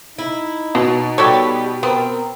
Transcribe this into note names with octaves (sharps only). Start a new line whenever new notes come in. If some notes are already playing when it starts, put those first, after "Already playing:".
D#4 E4
B2 F#3
G3 B3 F#4 G4 A4 C#5
B3 C4 A#4